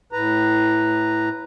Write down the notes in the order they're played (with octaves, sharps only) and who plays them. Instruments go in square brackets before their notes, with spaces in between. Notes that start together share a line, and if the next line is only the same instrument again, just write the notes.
[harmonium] A2 B4 A#5